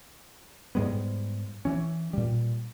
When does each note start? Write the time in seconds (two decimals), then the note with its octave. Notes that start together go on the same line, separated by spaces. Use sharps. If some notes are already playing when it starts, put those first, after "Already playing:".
0.75 G#2 G3 G#3 B3
1.65 E3 C#4
2.13 A#2 G3